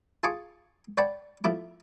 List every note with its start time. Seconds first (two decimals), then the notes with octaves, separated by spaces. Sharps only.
0.23 F4 G#4 G#5 A5 C#6 D6
0.98 C#5 D5 F#5 G5 A5 B5
1.44 F3 A3 E4 D6